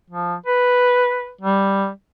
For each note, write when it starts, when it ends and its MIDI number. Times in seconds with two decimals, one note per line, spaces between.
0.10 0.34 53
0.46 1.32 71
1.41 1.88 55